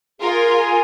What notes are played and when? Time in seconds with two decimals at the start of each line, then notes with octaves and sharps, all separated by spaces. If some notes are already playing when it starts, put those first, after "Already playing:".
0.21 F4 G#4 A#4
0.60 G#5